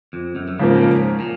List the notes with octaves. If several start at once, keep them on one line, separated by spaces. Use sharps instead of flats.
F2
F#2
F#2
G#2 C#3 F3 A#3
B2
A#2
G#2
A#2